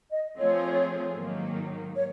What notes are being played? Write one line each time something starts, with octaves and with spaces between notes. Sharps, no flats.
D#5
F3 A3 C4 F4 G#4 C#5
G#2 D#3 F#3 A#3 D#4
C#5